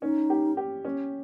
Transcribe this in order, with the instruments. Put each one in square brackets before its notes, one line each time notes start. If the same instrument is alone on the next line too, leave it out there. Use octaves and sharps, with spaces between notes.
[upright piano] C#4 [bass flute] D#4
[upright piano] G4
G4
C#4